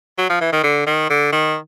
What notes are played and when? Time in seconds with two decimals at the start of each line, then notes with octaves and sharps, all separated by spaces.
0.18 F#3
0.30 F3
0.41 E3
0.52 D#3
0.64 D3
0.86 D#3
1.10 D3
1.32 D#3